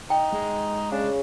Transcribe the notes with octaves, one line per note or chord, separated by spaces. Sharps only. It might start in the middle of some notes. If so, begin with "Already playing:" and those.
D#4 G5
G#3
C#3 D4